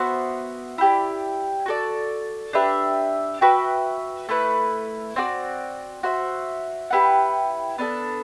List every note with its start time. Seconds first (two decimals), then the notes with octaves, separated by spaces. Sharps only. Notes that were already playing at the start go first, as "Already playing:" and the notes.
Already playing: B3 F#4 C5 E5
0.78 E4 G4 D5
1.66 F#4 A4 D5
2.53 D4 G4 B4 E5
3.41 F#4 B4 E5 G5
4.29 A3 E4 B4
5.16 C4 F#4 B4 D5
6.03 F#4 C5 E5
6.91 E4 G4 B4 F#5
7.78 B3 D4 A4